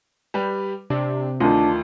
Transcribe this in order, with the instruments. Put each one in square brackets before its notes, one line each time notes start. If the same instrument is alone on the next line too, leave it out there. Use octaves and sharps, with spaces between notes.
[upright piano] G3 G4 B4
[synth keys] C3 [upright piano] D4
[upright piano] D2 D#3 [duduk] D4 [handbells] F4